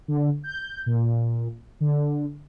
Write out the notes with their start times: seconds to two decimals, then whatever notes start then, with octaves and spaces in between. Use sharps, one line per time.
0.08 D3
0.44 G6
0.86 A#2
1.81 D3